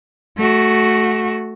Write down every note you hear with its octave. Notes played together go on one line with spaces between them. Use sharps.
A3 F#4